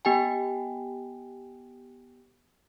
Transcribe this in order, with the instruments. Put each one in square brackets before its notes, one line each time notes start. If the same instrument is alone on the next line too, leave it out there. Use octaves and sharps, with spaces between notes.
[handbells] B3 G4 G5 G#5